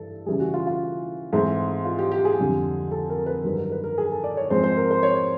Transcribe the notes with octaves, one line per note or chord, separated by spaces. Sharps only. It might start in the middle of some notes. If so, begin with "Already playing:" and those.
Already playing: G2 E3 A4
C#3 E3 G3 G#4
F#4
F4
F4
G#2 E3 A3 C4
F4
G4
G4
G#4
F2 D3 G3
A4
A#4
B4
G2 D#3 F#3 A#4
A#4
B4
A#4
G#4
A4
D5
C#5
G#2 F3 G#3 C4 C5
C5
A#4
C5
C#5